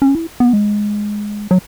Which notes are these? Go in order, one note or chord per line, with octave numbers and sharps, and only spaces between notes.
C#4
E4
B3
G#3
F#3